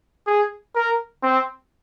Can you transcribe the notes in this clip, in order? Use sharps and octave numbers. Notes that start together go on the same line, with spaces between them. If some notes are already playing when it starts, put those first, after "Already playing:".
G#4
A#4
C4